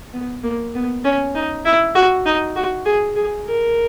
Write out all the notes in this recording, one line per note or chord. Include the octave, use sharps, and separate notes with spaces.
B3
A#3
B3
C#4
D#4
E4
F#4
D#4
F#4
G#4
G#4
A#4